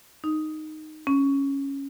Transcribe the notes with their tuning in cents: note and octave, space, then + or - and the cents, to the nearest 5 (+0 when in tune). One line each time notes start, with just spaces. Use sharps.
D#4 -5
C#4 -5